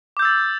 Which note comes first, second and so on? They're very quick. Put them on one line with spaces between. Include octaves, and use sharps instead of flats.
D6 G6 E6 A6